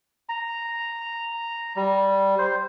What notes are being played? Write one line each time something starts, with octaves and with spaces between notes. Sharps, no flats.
A#5
G3
C5